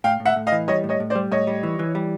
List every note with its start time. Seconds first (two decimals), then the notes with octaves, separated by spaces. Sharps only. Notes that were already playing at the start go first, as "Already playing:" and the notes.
0.04 A2 F5 G5
0.20 A2
0.25 E5 F#5
0.36 A2
0.47 D#5 F5
0.52 E3
0.68 G3 C#5 D#5
0.84 A2
0.89 C#5 D#5
1.00 A2
1.10 C5 D5
1.15 G3
1.31 A2 C#5 D#5
1.47 G3
1.63 E3
1.79 E3
1.95 G3